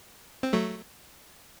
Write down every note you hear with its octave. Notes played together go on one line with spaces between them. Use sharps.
C4
F#3 A3